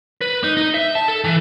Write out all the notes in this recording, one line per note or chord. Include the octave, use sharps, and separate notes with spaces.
B4
D#4
D#4
E5
A5
A4
E3